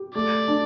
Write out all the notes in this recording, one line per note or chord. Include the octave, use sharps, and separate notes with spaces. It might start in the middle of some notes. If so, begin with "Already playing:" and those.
Already playing: G4
A3 D5
D4